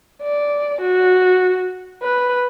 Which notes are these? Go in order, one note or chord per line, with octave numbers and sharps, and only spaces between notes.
D5
F#4
B4